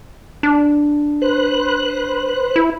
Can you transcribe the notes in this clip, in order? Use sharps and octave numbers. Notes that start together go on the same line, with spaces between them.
D4
B4 C5 F#6
E4